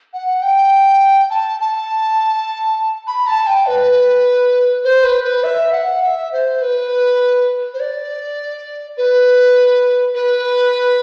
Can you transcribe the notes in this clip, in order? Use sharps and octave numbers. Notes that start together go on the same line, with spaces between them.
F#5
G5
A5
A5
B5
A5
G5
B4
C5
B4
B4
E5
F#5
E5
C5
B4
C5
D5
B4
B4